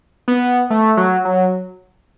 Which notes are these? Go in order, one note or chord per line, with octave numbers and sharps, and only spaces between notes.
B3
A3
F#3
F#3